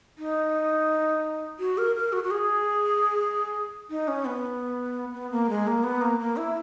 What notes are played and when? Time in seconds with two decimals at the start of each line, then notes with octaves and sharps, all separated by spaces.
0.18 D#4
1.60 F#4
1.78 A#4
1.96 A#4
2.13 F#4
2.24 F#4
2.31 G#4
3.90 D#4
4.08 C#4
4.25 B3
5.14 B3
5.31 A#3
5.49 G#3
5.67 A#3
5.84 B3
6.01 A#3
6.20 A#3
6.37 E4